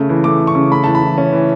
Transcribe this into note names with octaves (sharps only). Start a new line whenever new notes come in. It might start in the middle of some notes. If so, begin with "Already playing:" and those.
Already playing: C#3 A3
E3
A3 D6
C#3
C#6
C#3
A3 B5
E3 A5
B5
E3
C#4
E3